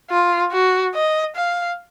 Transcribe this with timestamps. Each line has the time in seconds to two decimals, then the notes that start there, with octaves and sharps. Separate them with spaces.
0.10 F4
0.52 F#4
0.95 D#5
1.36 F5